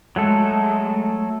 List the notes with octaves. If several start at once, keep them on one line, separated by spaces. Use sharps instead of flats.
F#3 G#3 A3 A4